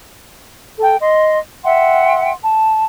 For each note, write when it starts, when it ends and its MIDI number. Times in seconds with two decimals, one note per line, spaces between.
0.79 0.95 69
0.79 0.95 79
0.99 1.37 75
0.99 1.37 84
1.63 2.33 76
1.63 2.33 78
1.63 2.33 79
1.63 2.33 84
2.42 2.83 81